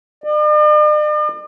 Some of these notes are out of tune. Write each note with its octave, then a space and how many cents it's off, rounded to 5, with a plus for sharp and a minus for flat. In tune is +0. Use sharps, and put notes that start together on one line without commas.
D5 +45